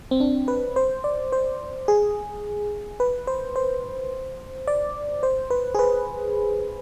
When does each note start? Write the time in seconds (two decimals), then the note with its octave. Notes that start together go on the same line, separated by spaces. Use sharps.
0.11 C4
0.20 D4
0.48 B4
0.76 C5
1.04 D5
1.32 C5
1.88 G#4
3.00 B4
3.27 C5
3.56 C5
4.67 D5
5.23 C5
5.50 B4
5.74 G#4
5.79 B4